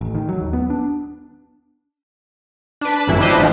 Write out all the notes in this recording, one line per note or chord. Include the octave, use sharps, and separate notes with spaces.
A1
D#3
F#3
D#2
B3
D4
D4 B4
A5 B5
G#1 F#2 E3 E4
D4 E4 G4 B4 C5 D#5
A1 D#3 F3